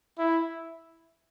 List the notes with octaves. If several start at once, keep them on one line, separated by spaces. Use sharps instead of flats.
E4